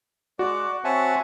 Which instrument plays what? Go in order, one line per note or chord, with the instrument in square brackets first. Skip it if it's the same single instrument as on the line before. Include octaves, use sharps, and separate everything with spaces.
[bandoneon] G#3 [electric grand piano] F#4 [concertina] D5
[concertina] C4 C#5 A5 [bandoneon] E5 F#5 G#5